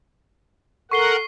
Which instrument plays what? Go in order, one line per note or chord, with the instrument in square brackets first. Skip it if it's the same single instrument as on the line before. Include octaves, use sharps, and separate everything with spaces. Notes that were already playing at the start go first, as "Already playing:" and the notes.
[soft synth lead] A4 [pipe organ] A#4 F#5 [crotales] C#6 C7 G7